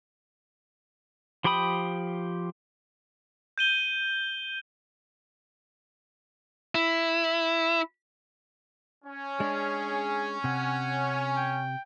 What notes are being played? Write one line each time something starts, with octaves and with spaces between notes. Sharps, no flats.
F3 G4 G5 B5 D#6
G6 D#7 G7
E4
C#4
G#3 D4 G#4
C3 F#5
G5